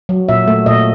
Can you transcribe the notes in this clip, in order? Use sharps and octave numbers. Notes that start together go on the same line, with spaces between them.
F#3
A#2 E5
A3
A#2 D#5